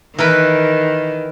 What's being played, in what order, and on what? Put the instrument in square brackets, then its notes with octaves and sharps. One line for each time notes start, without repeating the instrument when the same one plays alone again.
[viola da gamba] D#3 [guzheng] E3 A#4 B4